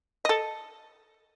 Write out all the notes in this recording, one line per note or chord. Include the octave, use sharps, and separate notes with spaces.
A4 D#5